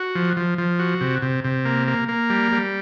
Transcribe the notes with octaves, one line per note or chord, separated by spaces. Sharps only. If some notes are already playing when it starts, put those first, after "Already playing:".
Already playing: F#4
F3
F3
F3
F#4
C3
C3
C3
A#3
A#3
A#3
G3
G3